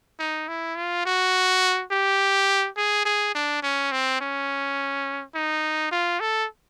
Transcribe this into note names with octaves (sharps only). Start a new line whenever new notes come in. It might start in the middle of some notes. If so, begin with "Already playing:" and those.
D#4
E4
F4
F#4
G4
G#4
G#4
D4
C#4
C4
C#4
D#4
F4
A4